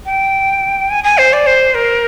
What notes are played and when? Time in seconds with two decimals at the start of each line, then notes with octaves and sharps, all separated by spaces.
0.06 G5
0.90 G#5
1.04 G#5
1.18 C5
1.33 D5
1.47 C5
1.75 A#4